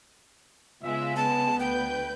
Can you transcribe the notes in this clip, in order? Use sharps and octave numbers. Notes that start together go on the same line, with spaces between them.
C#3 G#3 B3 F4 E5
B3 A5
D2 B4 G5 G6